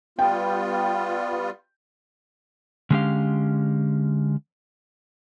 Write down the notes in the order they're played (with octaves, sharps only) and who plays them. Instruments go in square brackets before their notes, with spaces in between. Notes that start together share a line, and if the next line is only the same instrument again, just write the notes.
[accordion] G3 B3 F4 [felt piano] G5
[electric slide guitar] D3 G#3 C#4 E4 G4 F5